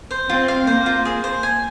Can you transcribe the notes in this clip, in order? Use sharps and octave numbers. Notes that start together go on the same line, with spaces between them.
C5
C4 F4
F5
A#3 C5
F4
G#4
C5
G#5